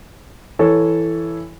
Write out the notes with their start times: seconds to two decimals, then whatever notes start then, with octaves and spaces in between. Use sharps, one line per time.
0.59 E3 A4 C#5